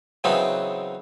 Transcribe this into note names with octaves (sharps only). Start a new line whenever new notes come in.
C#3 E3 F#3 B3 C4 D#4